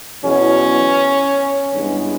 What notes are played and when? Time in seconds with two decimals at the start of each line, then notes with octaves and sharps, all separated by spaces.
0.23 E2 B2 F#3 B3 C#4
1.74 G2 E3 G#3 B3